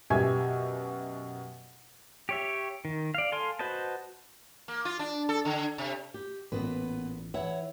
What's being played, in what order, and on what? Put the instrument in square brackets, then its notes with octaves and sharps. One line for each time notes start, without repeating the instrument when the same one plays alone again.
[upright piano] F#2 B2 G4 E5 G#5 G#6
[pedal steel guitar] G4 C#5 E5
D#3
D5 F5
A4 F5 G#5 C6
F#4 B4 C5 D#5 A5
[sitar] A#3
F4
D4
A4
D3
C3
[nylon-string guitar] G4
[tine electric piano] A1 [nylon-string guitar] A#2 [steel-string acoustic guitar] B3 B4
[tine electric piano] E3 [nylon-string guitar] E4 [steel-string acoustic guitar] C#5 F#5